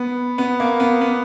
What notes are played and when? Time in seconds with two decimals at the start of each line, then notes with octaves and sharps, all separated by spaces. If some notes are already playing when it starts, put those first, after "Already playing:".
Already playing: B3
0.38 B3
0.60 A#3
0.80 B3
1.01 B3